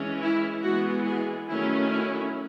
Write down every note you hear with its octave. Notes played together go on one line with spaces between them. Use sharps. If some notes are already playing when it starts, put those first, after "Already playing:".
Already playing: E3 G#3 C#4
E4
E3 G#3 B3 F#4
G#4
D#3 F#3 A3 C#4 E4
E4